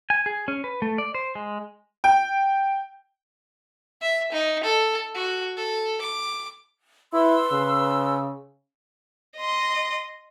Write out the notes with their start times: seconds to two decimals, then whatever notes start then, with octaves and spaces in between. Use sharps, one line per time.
0.10 G#5
0.26 G#4
0.48 C#4
0.64 B4
0.82 A3
0.98 D5
1.15 C5
1.35 G#3
2.04 G5
4.01 E5
4.32 D#4
4.64 A4
5.15 F#4
5.57 A4
6.01 D6
7.13 E4 B4 C6 E6
7.51 C#3
9.37 D#5 C6